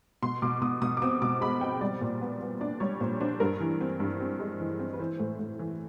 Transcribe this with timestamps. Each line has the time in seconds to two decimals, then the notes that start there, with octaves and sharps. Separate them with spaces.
0.22 B2 C6
0.42 B2 D6
0.61 B2 D#6
0.82 B2 D#6
0.97 D6
1.02 C4 D#6
1.22 B2 D6
1.41 G#3 B5
1.61 C4 G5
1.81 G3 D5
2.01 A#2
2.21 B3
2.41 B3
2.61 D4 D5
2.80 G3 C#5
3.00 A#2 C5
3.20 D4 C5
3.40 G2 A#4
3.60 E3
3.81 C4
4.00 G2
4.20 C4
4.40 G#3
4.60 E3
4.79 C4
4.93 B4
5.00 E3 C5
5.19 A2
5.39 A2
5.59 E3